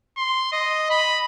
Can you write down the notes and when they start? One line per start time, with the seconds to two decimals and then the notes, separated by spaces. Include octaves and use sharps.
0.17 C6
0.52 D#5
0.90 B5